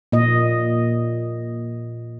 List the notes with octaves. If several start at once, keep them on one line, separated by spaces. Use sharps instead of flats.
A#2 D#5